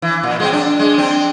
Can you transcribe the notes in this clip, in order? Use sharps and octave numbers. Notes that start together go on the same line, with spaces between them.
E3
A#2
G#3 C4
D4
G#3
C4 D4